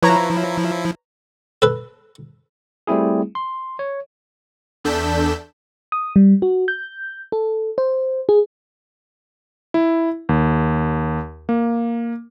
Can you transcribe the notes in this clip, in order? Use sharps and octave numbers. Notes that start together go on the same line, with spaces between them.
F3 E4 B4 C#5 A#5
A4 B4
G3 A3 C4 E4 G#4
C6
C#5
E2 D4 A4 G6 B6 E7
D#6
G3
F#4
G6
A4
C5
G#4
E4
D#2
A#3